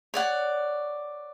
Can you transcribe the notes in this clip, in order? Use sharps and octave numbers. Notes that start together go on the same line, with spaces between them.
C#5 D5 F#5